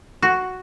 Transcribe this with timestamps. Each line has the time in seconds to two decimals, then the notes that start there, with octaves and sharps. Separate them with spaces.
0.22 F#4